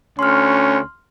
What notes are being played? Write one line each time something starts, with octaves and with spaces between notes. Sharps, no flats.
D2 C#4 C6 F6